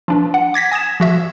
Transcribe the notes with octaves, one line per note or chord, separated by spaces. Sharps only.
F3 D4 B4
F#5
D6 G#6 A#6 B6
G#5 D#6 G#6 E7
F3 F#4 E5